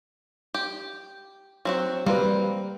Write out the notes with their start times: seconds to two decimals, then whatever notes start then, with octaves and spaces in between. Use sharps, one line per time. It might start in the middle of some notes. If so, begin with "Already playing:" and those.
0.54 G4
1.65 F#3 C4 F#4
2.06 G3 A#3 C4 B4